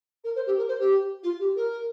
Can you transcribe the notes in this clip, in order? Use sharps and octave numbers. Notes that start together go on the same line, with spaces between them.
A#4
C5
G4
A#4
C5
G4
F4
G4
A#4